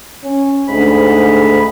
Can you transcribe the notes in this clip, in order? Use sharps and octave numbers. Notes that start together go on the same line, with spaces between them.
C#4
D2 G#2 B5